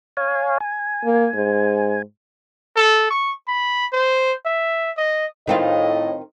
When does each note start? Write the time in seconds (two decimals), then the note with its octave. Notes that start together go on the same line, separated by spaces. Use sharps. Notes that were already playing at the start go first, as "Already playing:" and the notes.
0.17 C#5 F5 G#5
0.60 G#5
1.04 A#3
1.35 G#2
2.76 A4
3.10 C#6
3.47 B5
3.93 C5
4.46 E5
4.97 D#5
5.47 A2 D#3 C4 F4 D#5